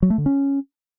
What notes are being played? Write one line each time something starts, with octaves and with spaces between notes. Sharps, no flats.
F#3
A3
D3
C#4